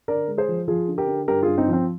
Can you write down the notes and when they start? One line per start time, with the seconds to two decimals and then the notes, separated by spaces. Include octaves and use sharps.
0.08 D3 A#4 D5
0.28 G#3
0.38 G#4 C5
0.48 F3
0.68 F3 F4 G#4
0.88 D3
0.98 G4 A#4
1.08 D3
1.28 G2 G4 A#4
1.43 G2 F4 G#4
1.58 C4 D#4
1.68 F3
1.73 C4